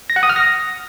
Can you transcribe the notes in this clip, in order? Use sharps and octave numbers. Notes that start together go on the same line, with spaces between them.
A#6
F#5
D#6
F6
A#6